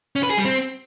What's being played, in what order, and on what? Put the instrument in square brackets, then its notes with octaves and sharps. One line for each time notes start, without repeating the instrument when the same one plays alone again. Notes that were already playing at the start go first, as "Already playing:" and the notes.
[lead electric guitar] C#4
B4
G#4
G3
C4